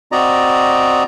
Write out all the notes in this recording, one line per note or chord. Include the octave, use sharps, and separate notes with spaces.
C4 F#4 D5 D#5 A#5